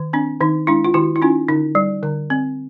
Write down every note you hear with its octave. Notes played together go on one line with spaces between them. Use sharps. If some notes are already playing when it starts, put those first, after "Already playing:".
Already playing: D#3
C4 D4
D#3 D#4
G#3 D4 E4
F4
D#3 E4 F#4
E4
C#4 D#4 F4
D3 D#4
G3
D3
C4